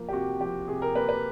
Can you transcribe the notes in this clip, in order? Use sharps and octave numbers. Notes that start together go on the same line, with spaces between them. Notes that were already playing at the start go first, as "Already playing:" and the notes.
Already playing: F3 A#3
G4
C3 F#4
F3 G4
C3 G#4
A#4
A#3 B4
B4